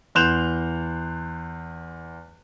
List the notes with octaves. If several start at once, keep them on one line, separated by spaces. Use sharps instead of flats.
E2 C6 F#6 G6 E7 F7